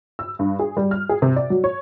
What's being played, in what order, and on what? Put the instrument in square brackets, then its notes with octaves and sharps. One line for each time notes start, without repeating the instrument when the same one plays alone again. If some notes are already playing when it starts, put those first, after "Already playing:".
[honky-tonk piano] E6
G2
G#4
G3
F6
G#4
C3
D5
F#3
C#5